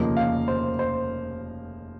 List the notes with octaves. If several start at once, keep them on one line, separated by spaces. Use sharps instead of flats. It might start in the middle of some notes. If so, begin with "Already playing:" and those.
Already playing: F1 D#2 C#3 F3 A#3 D#5
F5
C5
C5